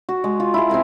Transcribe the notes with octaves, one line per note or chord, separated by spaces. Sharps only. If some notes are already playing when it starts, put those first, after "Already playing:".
F#4
G#3
F4
E4 G#4
C4 G#4 G#5 A#5